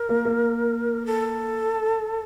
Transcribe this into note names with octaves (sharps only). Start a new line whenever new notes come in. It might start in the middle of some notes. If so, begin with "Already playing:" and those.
Already playing: A#4
A#3
A#3
A4